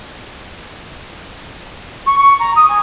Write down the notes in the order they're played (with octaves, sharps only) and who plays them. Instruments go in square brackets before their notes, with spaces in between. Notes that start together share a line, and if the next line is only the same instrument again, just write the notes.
[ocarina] C#6
C#6
A#5
D#6
G#5